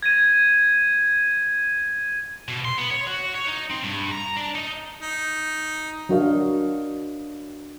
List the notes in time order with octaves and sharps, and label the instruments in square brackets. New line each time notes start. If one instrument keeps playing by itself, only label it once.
[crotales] G#6 A#6 D#7
[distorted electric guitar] B2
C6
B3
C#5
F#4
C#5
D#4
C4
G2
A#5
D4
D#4
[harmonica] D#4
[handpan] F#3 D4 F#4 A#4 D#5 F5